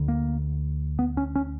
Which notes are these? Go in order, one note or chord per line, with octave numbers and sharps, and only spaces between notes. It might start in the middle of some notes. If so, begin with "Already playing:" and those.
Already playing: D2 D3
A#3
B3
C#4
C#4